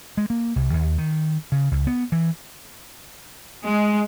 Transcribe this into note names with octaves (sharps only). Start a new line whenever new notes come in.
G#3
A#3
C2
D#2
D#3
C#3
C#2
B3
E3
G#3